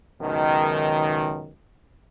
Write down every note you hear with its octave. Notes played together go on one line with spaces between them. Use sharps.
C#2 F#2 B2 D#3